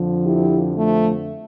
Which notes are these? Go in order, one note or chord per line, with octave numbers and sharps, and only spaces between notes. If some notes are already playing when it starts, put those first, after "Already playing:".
Already playing: F2 D3 F3
E4 G4
F3 A3